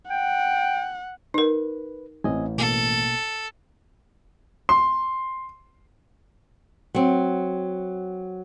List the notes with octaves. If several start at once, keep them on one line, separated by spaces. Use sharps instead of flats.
F#5 G5
D#4 A#4 B4
A1 C4 D#5 G#5
B2 A#3 A4
C6
F#3 C4